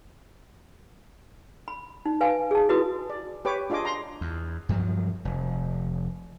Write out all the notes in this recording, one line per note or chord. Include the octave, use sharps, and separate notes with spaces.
B5
D#4
B4 F5 G#5
G#4 A5
E4 F#4 B4 D#6
D5
G4 B4 C#5 D6
D4 F4 G#4 D#5 D6
A#5 C6
E2
G2 F3 F#3
F1